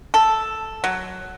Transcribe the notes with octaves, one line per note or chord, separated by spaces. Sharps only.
A4
F#3